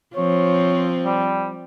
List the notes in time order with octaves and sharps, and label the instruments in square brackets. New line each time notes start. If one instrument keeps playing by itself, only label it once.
[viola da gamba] F3 C4 [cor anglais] C#5
[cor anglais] G3